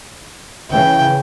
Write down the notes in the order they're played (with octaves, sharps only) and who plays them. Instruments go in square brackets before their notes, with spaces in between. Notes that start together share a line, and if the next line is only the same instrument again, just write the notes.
[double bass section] C#3 E3 [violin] G5